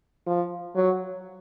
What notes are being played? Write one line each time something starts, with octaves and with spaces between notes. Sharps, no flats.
F3
F#3